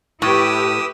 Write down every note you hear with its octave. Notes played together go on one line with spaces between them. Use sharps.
A2 E4 G4 B4 D#6 E6